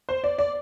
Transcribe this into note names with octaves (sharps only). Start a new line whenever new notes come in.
C5
D5
D5